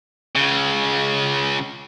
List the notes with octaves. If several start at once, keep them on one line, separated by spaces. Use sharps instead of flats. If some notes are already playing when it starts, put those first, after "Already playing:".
C#2 C#3